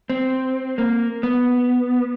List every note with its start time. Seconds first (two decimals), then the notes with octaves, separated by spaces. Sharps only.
0.10 C4
0.78 A#3
1.23 B3